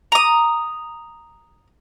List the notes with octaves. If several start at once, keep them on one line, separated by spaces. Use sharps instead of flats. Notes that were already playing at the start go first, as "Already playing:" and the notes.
A#5 D#6